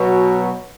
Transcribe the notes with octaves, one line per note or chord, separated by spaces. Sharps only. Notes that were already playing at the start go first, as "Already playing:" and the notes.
Already playing: B2 F#3